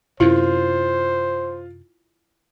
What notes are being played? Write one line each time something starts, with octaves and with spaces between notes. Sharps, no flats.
F#2 C3 E4 F4 C5